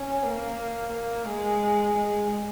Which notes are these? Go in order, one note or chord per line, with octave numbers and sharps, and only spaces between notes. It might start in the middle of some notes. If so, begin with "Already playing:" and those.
Already playing: C#4
A#3
A#3
G#3
G#3